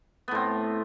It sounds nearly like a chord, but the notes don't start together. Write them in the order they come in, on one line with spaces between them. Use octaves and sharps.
B3 A2 C4